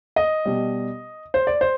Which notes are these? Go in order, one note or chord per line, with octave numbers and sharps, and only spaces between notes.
D#5
B2 G3
C5
D5
C5